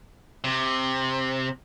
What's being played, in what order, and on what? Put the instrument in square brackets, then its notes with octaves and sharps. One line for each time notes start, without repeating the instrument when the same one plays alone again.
[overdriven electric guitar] C3